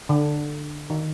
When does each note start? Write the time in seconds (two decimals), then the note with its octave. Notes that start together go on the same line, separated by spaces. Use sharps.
0.09 D3
0.90 D#3